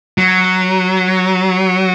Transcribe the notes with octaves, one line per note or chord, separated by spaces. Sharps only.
F#3